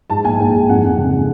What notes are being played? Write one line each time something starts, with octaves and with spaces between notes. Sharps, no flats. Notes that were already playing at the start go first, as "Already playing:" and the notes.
G#2 A5
A#1 G#5
G#2 G5
G#2
F2 F#5
F2
C#3
C#3